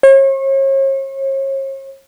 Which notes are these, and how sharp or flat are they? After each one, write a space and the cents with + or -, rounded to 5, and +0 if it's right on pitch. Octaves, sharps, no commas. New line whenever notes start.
C#5 -40